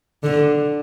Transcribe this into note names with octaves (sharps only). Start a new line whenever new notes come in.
D3